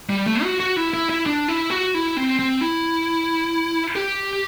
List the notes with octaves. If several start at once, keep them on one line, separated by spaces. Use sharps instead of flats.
G3
A3
F#4
F#4
E4
E4
E4
D4
E4
F#4
E4
C4
C4
E4
G4